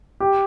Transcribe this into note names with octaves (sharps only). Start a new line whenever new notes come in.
G4